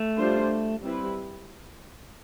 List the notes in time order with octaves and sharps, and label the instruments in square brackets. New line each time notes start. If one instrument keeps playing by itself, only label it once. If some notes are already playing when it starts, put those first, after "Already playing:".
Already playing: [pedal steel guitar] A3
[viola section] G3 D4 F4 C5
G3 C4 E4 B4